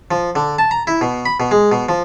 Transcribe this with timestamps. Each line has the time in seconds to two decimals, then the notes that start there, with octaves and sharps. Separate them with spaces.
0.11 F3
0.35 D3
0.59 A5
0.71 A#5
0.87 E4
1.01 B2
1.26 B5
1.40 B2
1.51 G#3
1.72 B2
1.89 F3